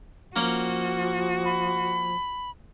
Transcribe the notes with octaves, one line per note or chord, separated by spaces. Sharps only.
F3 A#3 C#4 F#4
B5